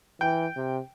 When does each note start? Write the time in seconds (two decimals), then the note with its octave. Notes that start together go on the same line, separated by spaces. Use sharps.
0.21 E3 G5
0.56 C3